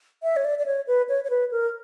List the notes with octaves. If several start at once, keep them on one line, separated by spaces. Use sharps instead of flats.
E5
C#5
D5
D5
C#5
B4
C#5
C#5
B4
A#4